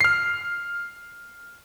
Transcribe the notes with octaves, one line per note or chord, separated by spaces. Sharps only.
F6 C7